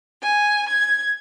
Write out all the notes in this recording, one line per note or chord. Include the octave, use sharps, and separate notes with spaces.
G#5
G#6